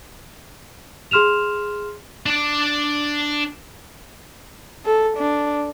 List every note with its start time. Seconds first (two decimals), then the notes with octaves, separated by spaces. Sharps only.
1.11 G#4 C6 F6 E7 F7
2.26 D4 D5
4.86 A4
5.17 D4